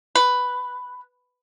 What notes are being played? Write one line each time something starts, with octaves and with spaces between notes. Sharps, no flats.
B4